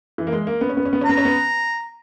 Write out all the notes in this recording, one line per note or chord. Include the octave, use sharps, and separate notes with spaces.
E3
A#3
G#3
A#3
B3
C#4
B3
C#4
B3
C#4
B3 A#5
C#4
B3